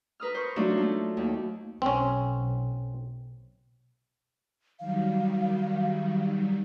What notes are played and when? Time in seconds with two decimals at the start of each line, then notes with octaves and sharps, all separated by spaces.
0.20 A#4 B4 D#6 F6
0.34 C5 C#6
0.56 F#3 A3 D4 D#4 F4 F#4
0.77 A3 D#4
1.17 D#2
1.82 B1 C4 C#4
4.79 D#3 F#3 G3 F5